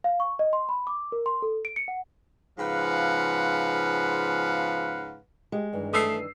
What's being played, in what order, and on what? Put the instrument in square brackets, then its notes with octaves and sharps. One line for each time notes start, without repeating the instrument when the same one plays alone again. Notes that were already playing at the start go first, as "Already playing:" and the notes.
[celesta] F5
C#6
D#5
C6
B5
D6
A#4
C6
A4
D7
C#7
F#5
[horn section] G#2 C#3 F3 B4 F5 F#5
[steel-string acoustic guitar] G#3 [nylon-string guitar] G4
[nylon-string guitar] G2 D#3 E3
[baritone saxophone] A3 [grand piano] D#6 E6 C7